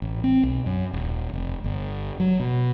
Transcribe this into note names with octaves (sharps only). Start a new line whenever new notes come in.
A1
C4
B1
F#2
D#1
F1
G1
F#3
B2